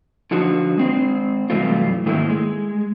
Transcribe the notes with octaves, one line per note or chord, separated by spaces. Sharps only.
D3 F3 D#4 F#4 C5
G#3 C4 C5
G2 C3 E3 F#3 A3 F4
G#2 D#3 A3 A#3 E4
G#3